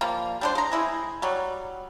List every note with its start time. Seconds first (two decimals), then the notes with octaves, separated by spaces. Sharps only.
0.01 F3 G3 A#3
0.41 G3 D4 C5
0.55 G#3 A#5
0.72 G#3 E4 G#4
1.22 F#3 G3